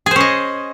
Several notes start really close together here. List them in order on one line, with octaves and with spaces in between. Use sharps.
G#4 C5 C#4 D#5